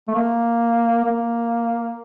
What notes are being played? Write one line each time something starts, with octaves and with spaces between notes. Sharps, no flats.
A3
A#3
A#3